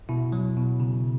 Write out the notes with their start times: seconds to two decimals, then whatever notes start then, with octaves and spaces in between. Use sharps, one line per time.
0.09 B2 E4
0.32 F#3
0.57 B2
0.80 C#3